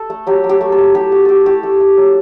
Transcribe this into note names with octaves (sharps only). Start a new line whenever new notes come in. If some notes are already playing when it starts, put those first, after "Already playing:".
Already playing: A4
A3
F#3 G4
F#3
G4
A3
A4
A3
E4 G4
A3 F#4
A3 G4 A4
E4 G4
A3 A4
A3
F#3